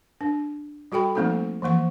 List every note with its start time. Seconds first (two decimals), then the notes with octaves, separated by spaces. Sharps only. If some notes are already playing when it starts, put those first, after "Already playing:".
0.21 D4
0.92 G3 F#4 A4 G5 B5
1.15 F3 A3 A#3 C4 D#4 A4
1.62 E3 F3 A#3 C#6